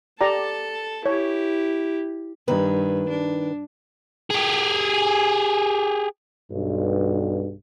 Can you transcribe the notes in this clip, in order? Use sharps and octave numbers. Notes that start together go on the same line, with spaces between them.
G4 A4 D5 A5 A#5
E4 G4 C#5
G2 D#3 B4
D4
G4 G#4
B1 G2